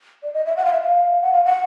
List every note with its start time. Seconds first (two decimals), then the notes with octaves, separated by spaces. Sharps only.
0.23 D5
0.34 D#5
0.46 E5
0.57 F#5
0.65 F5
0.73 E5
0.82 F5
1.22 F#5
1.33 F5
1.45 F#5